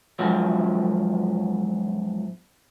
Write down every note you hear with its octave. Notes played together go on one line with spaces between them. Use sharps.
E2 G#2 F3 F#3